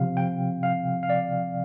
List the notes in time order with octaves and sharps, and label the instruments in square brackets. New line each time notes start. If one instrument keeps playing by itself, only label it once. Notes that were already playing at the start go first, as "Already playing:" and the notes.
Already playing: [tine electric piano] C3 F3 C4 F5
G5
F5
F5
D5